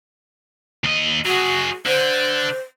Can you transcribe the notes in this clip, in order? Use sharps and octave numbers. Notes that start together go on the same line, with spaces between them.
D#2 D#5
F#3 F#4 G#4
D3 C5